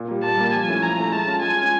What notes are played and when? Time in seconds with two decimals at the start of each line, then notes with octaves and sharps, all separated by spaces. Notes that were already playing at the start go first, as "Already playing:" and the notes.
Already playing: A#2
0.08 G3 A#3
0.23 A#2 A5
0.37 G3 A#3
0.53 F3 G#5
0.68 A3 C#4 E4
0.83 F3 A#5
0.98 A3 C#4 E4
1.12 G#3 A5
1.28 C#4 F4
1.42 G#3 G#5
1.58 C#4 F4